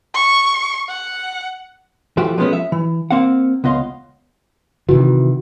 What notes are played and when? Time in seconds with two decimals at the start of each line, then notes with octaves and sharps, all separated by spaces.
0.14 C#6
0.89 F#5
2.17 E3 F3 A3 F#4 G4
2.38 F3 G#3 A3 B3 C#4
2.53 E5
2.72 E3
3.11 A#3 C4 F5 F#5
3.64 C#2 B3 D#5 F5 C6
4.89 C3 D#3 E3 F#4